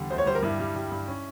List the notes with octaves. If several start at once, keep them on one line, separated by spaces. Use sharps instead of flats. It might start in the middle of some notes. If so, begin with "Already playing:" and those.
Already playing: E2 D3 G3
D2 C5
C#5
G3 C5
A#4
G2 E4
G3
G3
G2
C#4